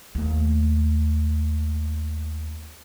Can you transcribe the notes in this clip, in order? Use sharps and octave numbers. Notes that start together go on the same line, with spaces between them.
D#2 A3